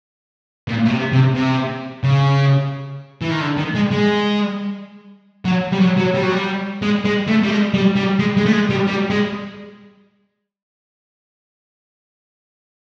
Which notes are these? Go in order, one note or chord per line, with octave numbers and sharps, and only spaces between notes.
A#2
B2
C3
C3
C3
C#3
E3
D#3
D3
D#3
G#3
G#3
F#3
G3
F#3
F#3
G3
F#3
G3
G#3
G#3
A3
G3
G#3
G3
G3
G#3
G#3
A3
G#3
G3
G3
G#3